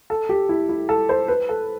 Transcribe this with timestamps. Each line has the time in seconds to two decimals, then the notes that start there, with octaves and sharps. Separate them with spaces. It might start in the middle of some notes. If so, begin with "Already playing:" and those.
0.10 A4
0.29 G4
0.49 E4
0.69 E4
0.89 A4
1.09 C5
1.28 B4
1.49 A4